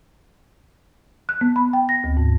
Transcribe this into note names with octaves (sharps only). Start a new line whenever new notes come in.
F#6
B3
B5
G5
A#6
D2
G#2